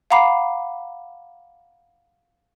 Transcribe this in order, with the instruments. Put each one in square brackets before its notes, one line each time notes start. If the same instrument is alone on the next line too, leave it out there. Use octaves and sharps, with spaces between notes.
[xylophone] F5 F#5 A#5 B5 D6 C7